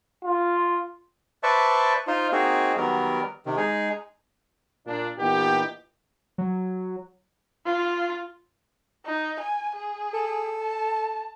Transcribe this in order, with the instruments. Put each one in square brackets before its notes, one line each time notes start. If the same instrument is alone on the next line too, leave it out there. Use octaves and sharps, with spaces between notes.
[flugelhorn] F4
[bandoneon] B4 C5 D5 E5 A5 C#6
D#4 F4 C5
A#3 C4 D#4 F#4 G#4
D#3 F#3 G3 B3 A#4
C3 D#3
G#3 D#4 G#4
[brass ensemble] A#2 D4
A#2 E3 B3 D#4 G4
[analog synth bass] F#3
[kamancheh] F4
[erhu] D#4
G#5
G#4
[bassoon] A4
[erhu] A5